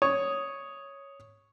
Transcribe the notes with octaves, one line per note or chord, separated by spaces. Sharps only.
C#5 D#6